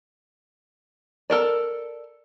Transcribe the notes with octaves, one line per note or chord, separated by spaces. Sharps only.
A4 A#4 D5